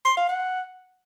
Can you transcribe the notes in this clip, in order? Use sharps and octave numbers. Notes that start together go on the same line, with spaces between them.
C6
F5
F#5